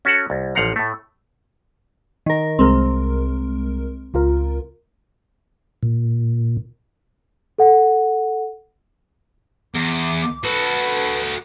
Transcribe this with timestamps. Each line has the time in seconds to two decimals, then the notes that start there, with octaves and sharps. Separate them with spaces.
0.05 C#4 F#4 A4 F#5
0.30 C2
0.55 A1 F3 F5 F#5 A#5
0.76 A2 A3
2.26 D#3 A#4
2.59 C2 G#3 C4 A#4
4.14 C#2 F4 A#4
5.83 A#2
7.59 A4 F#5
9.75 E2 D6
10.44 F#4 A4 B4